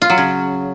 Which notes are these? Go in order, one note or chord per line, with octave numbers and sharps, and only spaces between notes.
F4
F#3
C#3